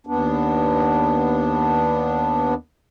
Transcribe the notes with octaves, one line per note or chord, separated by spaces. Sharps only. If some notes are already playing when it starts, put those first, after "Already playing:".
D#2 B3 D4